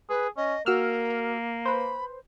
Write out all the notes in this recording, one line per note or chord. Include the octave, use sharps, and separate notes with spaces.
G#4 B4
C#4 D#5
A#3 F#4 A#4 E6 F6
B4 C5 B5